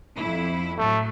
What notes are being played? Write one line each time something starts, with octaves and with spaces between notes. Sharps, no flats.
F2 E4
A2 F#3 A3